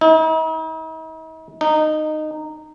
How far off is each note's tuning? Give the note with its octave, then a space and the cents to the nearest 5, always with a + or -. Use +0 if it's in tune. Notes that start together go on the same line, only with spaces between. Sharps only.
D#4 +45
D#4 -15